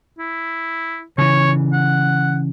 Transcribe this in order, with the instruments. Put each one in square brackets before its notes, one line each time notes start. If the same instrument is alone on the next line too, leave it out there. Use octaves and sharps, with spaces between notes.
[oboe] E4
[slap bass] C#3 E3 [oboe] C#5
[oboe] F#5